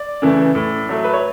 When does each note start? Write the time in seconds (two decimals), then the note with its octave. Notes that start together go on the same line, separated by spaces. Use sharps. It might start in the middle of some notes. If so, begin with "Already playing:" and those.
Already playing: D5
0.22 C#3 E3 A3
0.55 A2
0.89 F#3 A3
1.04 B4
1.13 C#5